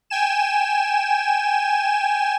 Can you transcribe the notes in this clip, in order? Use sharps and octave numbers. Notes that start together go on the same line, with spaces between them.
G5 G#5 E7